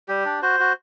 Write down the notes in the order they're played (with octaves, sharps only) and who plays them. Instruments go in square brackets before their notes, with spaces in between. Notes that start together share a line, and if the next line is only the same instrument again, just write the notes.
[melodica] G3 G4
D4
F#4 C5
F#4